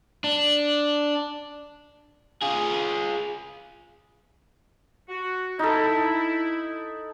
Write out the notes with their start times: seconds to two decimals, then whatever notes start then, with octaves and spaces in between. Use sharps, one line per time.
0.24 D4
2.42 F4 G#4
5.09 F#4
5.59 D#4 E4 A4